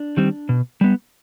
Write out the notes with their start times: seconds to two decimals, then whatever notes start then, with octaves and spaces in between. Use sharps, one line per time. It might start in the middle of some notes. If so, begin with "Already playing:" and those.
Already playing: D4
0.17 D#3 G3 C4
0.49 B2
0.81 G3 B3